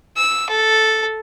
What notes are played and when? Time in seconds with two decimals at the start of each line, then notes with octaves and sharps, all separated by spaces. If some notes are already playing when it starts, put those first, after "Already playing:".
0.17 E6
0.50 A4